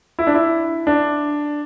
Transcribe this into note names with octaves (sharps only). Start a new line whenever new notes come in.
E4
D4
E4
D4